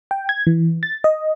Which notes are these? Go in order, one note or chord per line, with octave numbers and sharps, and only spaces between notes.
G5
G#6
E3
A6
D#5